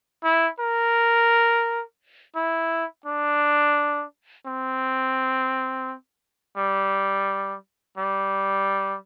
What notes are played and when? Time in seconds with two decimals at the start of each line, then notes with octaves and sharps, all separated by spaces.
0.24 E4
0.60 A#4
2.36 E4
3.06 D4
4.47 C4
6.57 G3
7.98 G3